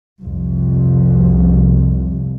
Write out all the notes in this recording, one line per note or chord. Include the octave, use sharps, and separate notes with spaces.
C2 F2